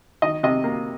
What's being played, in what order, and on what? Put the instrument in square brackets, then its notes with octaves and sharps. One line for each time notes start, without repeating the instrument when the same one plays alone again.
[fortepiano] D#3 D#5
C3 D#5
A#3